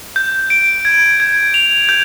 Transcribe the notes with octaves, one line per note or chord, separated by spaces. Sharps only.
G6
D7
G#6
G#6
F7
G6